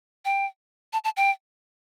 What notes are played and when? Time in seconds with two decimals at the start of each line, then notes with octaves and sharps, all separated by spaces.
0.25 G5
0.93 A5
1.04 A5
1.17 G5